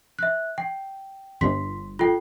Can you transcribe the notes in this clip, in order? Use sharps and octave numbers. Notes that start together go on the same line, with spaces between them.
E5 F#6
G5
G1 C6 B6
F4 A4 G5